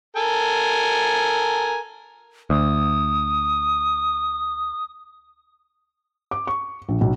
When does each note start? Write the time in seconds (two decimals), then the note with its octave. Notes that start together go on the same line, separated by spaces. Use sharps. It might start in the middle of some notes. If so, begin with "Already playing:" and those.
0.16 A4 A#4 G#5
2.50 D2 D#6
6.31 D6
6.47 C#6
6.89 A#1
7.01 B1